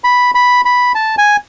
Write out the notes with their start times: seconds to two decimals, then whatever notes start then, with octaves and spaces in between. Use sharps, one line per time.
0.04 B5
0.35 B5
0.65 B5
0.95 A5
1.18 G#5